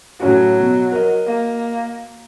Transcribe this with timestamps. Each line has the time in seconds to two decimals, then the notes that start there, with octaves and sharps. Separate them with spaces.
0.20 A2 F#3 C#4 F#4
0.59 B2
0.92 A#4 D#5
1.26 A#3